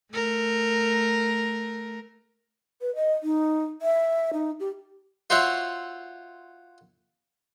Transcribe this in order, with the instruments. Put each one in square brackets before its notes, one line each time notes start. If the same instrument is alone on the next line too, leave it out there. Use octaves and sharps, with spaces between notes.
[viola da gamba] A3 A#4
[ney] B4
D#5
D#4
E5
D#4
G4
[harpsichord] F4 F#4 C5 C#5 E5 F#5